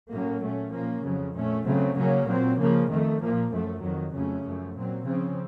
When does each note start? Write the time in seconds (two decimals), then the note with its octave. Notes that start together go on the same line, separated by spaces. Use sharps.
0.10 A2 F#3 A#3 C#4
0.41 A#2 A3 C#4
0.72 A#2 F3 A#3 C#4
1.03 F2 C#3 F#3
1.35 A#2 A3 C#4
1.66 C#3 F#3 A3 C4
1.96 C#3 F#3 A#3 C#4
2.28 A#2 F#3 C4
2.58 C#3 F3 A#3
2.90 F2 D#3 A3
3.20 A#2 F3 A#3
3.52 F#2 F3 A3
3.82 F2 D#3 F#3
4.13 F2 C#3 F#3 A3 C#4
4.44 F#2 F3 A3
4.75 A#2 F#3 C4
5.06 C#3 F3 C4